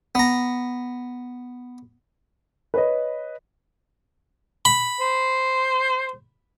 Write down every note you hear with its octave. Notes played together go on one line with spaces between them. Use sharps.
B3 A#5
B4 C#5 D#5
B5
C5